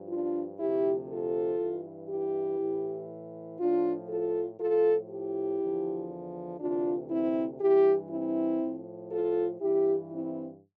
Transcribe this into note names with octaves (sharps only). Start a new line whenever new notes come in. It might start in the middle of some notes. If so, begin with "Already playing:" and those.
Already playing: G2 F3
D4 F4
D2 C3 F3 E4 G4
F4 A4
G2 E3
E4 G4
A2 E3
A2 F3 D4 F4
F4 A4
A2 F3 F4 A4
E4 G4
E2 D3 F3
D2 C3 E3 D4 F4
C4 E4
G2 E3 E4 G4
C4 E4
A2 F3
F4 A4
G2 E3 E4 G4
C4 E4